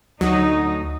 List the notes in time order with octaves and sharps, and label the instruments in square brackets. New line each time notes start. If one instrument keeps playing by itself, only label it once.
[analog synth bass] D2 [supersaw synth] F#3 [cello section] D#4